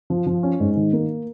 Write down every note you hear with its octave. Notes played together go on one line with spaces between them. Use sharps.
F3
F3
C#4
G#2
D#3
A#3